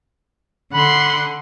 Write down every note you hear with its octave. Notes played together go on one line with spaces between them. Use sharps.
D3 F#5 B5 C6